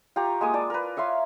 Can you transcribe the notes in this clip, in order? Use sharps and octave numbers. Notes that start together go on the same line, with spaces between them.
F4 G4 A#5 C#6
G#3 A#3 G#5 D#6
D5 A5
A#4 B4
C#5 E5 F5 C6